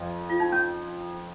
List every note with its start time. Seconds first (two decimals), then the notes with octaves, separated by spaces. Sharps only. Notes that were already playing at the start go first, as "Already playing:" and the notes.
Already playing: F2 F3
0.30 F4
0.40 D#4
0.52 C#4